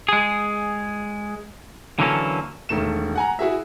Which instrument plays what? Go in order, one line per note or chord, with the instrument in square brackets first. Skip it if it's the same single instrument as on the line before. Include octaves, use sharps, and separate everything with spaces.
[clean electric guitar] G#3 G#4
D3 E3 F#3 A#3 C#4 A4
[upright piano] E1 D#3 A3 E7
F#5 G#5 A#5
E4 F#4 G#4 E5